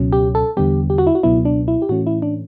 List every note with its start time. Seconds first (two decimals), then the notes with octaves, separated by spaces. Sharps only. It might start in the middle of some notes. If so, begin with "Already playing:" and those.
Already playing: C#2 B2 F#3 C#4
0.13 G4
0.35 A4
0.57 E2 D3 G3 B3 G4
0.90 G4
0.98 F#4
1.07 E4
1.15 F#4
1.23 C#2 B2 F#3 B3 E4
1.45 D4
1.68 E4
1.82 G4
1.89 A2 E3 A3 C#4 F#4
2.07 E4
2.22 D4